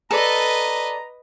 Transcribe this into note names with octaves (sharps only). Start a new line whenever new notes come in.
A4 B4 D5 D#5 A#5